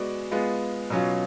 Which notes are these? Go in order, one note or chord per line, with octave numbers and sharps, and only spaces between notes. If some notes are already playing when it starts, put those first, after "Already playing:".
Already playing: G#3 B3 F#4 B4 D5
G#3 B3 F4
B2 F#3 C#4 F4